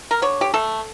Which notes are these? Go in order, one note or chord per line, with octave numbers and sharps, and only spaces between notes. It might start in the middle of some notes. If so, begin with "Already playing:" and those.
A#4
D3 C#5
G4
A3 A4